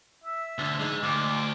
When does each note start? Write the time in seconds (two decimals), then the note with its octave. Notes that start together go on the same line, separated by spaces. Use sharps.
0.24 E5
0.58 D2 D3
0.79 G#3 D#4
1.03 D2 D6